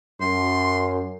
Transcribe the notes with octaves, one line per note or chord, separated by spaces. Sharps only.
F#2 C6